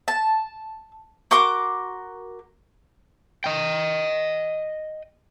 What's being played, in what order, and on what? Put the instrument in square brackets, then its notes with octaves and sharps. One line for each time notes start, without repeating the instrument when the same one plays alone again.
[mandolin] A5
F#4 A#4 C6 D6
[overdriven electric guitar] D#5 G5